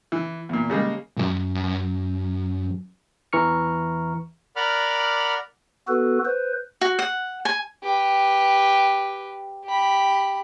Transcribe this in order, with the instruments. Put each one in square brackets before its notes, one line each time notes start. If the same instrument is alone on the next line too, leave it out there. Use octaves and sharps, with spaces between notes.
[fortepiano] E3
E2 A#2
C#3 G3 G#3 A#3
[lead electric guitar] B1 F#2
[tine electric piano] E2 E3 A#5 C#6 F6 C#7
[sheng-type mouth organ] A#4 D5 F#5 B5 D6 F6
[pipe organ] B3 F#4 A4 B4
B4 C5
[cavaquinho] F#4
F#5
G#5
[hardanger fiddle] G4 B4
G4 B5